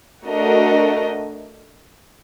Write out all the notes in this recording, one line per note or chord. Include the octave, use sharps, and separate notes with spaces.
A3 D4 F#4 A#4 D#5